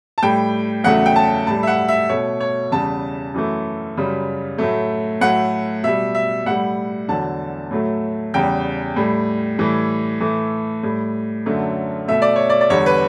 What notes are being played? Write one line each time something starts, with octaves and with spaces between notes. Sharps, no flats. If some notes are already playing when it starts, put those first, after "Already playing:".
A5
A2 G3 G5
E2 C#3 F#3 A3 F#5
G5
A5
A2 G3 A5
E5
F#5
E5
B2 A3 C#5
C#5
E2 C#3 G3 A5
F#2 E3 A3
F#2 C#3 G3
A2 F#3 A3
A2 F#3 A3 F#5
B2 G3 E5
E5
A2 G3 F#5
E2 D3 F#3 A5
A2 F#3 A3
E2 C#3 G3 G5
A2 G3
A2 E3 G3
A2 E3 A3
A2 G3
F#2 D3 F#3 A3
B2 A3 E5
D5
C#5
D5
D5
E2 D3 G3 C#5
B4